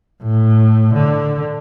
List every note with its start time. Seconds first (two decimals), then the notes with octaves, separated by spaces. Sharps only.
0.23 A2
0.94 D3